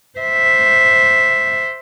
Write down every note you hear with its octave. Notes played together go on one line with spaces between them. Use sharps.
C5 E5